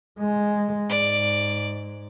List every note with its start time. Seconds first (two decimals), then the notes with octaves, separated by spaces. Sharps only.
0.19 G#3
0.89 G#2 D5